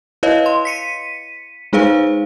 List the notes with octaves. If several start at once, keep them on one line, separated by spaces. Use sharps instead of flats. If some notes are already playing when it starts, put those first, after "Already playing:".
E4 B4 C#5 D#5 F5
C6
B6 C#7 D#7
G#3 D#4 G#4 B4 C5 F5